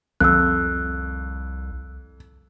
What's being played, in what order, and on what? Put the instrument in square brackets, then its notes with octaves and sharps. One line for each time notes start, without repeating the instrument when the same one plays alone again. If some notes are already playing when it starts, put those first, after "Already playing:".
[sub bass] C2 [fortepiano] F2 [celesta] E6 F#6